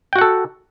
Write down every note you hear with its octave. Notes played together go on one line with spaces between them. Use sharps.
F#4 A4 F#5 G5